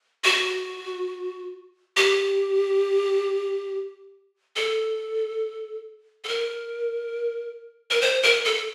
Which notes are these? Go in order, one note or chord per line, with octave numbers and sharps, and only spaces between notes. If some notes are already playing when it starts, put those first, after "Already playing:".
F#4
G4
A4
A4
A#4
A#4
C5
A#4
A4